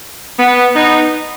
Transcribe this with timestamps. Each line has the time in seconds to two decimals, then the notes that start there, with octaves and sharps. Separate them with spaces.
0.39 B3
0.75 B3 D#4